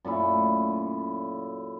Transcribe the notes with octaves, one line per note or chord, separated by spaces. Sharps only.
F#2 A#2 A3 E4